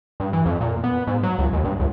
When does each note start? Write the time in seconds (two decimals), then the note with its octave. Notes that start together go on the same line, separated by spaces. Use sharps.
0.20 G2
0.33 E3
0.46 F2
0.61 A#2
0.84 B3
1.07 G#2
1.23 F#3
1.38 C#2
1.53 D#2
1.64 G2
1.80 C#2